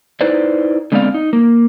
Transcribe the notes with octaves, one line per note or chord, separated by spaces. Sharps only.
D#4 E4 B4 C5 D5
D3 G#3 B3 C4 D5 F5
D#4
A#3